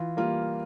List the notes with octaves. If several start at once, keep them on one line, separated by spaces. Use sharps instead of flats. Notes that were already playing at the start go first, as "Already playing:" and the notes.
Already playing: E3 F4
G3 A#3 F4